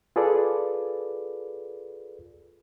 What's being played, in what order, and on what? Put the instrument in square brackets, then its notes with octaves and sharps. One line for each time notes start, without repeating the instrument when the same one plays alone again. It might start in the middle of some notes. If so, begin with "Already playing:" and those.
[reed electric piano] F4 G#4 A4 B4 D5